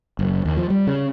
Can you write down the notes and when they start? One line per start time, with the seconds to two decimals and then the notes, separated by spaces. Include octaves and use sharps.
0.19 F#1
0.45 D#2
0.57 F3
0.70 G3
0.87 C#3